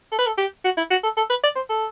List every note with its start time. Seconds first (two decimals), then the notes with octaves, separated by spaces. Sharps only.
0.12 A4
0.18 B4
0.26 A4
0.38 G4
0.64 F#4
0.77 E4
0.90 F#4
1.03 A4
1.17 A4
1.29 B4
1.43 D5
1.55 C5
1.69 A4